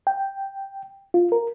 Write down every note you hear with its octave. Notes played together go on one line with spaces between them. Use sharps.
G5
F4
A#4